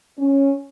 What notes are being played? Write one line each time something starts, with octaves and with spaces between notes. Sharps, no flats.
C#4